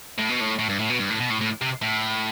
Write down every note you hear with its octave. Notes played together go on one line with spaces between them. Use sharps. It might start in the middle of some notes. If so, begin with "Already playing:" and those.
A2
B2
A2
A2
G2
A2
B2
G2
A2
B2
A2
A2
C3
A2